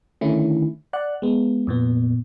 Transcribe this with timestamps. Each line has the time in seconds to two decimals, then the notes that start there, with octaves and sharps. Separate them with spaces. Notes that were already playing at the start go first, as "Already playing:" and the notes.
0.21 D3 D#3 A3 C#4 E4
0.93 D5 F#5 F#6
1.22 G#3 B3
1.67 F2 A#2 B3